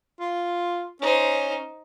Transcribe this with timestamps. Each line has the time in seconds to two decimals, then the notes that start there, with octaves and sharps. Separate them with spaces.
0.20 F4
1.01 C#4 D#4 C5